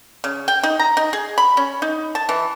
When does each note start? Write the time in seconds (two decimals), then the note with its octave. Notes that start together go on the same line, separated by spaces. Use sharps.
0.24 C#3
0.48 G5
0.63 D#4
0.79 A#5
0.97 D#4
1.13 G#4
1.38 B5
1.57 C#4
1.82 D#4
2.15 A5
2.29 E3